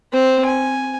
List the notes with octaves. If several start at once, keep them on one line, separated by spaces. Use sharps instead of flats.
C4 C5
G#5